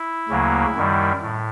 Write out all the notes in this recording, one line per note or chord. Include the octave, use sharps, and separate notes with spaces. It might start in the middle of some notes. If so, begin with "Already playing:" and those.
Already playing: E4
D2 C#3 F#3 A#3
F#2 D#3 G3
A2